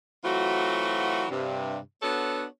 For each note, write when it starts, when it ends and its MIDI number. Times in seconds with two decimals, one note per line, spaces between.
0.25 1.26 52
0.25 1.26 54
0.25 1.26 57
0.25 1.26 60
0.25 1.26 65
0.25 1.26 66
1.31 1.79 43
1.31 1.79 48
2.03 2.45 59
2.03 2.45 62
2.03 2.45 66
2.03 2.45 69
2.03 2.45 73